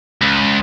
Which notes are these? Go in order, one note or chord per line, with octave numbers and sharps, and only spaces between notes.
C#2